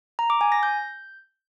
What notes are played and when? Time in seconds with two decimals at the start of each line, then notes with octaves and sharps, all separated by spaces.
0.19 A#5
0.30 D6
0.41 G#5
0.52 A#6
0.63 G6